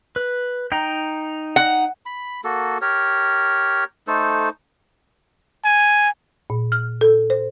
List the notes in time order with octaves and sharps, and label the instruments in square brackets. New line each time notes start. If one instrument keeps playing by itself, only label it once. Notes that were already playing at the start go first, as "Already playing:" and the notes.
[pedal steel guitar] B4
D#4 G5 A#5
[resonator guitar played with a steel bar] F#5
[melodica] B5
A#3 F#4 A4
G4 A#4 C#5
A3 D#4 A4 C5
[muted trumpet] G#5
[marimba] A#2
F6
A4
C5